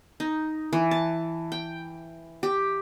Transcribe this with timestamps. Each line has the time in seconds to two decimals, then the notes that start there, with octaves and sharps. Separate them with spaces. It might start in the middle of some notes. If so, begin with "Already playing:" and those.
0.20 D#4
0.73 E3
0.91 A5
1.52 G5
2.43 G4